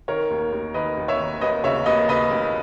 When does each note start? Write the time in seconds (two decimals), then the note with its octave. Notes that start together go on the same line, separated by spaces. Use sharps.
0.08 D#3 A#4 C#5
0.31 D#2
0.52 D#2
0.74 D#3 B4 D#5
0.97 D#2
1.08 C#5 E5
1.19 D#3
1.41 D#2 B4 D#5
1.64 C#3 C#5 E5
1.86 D#2 B4 D#5
2.09 C#3 B4 D#5
2.31 D#2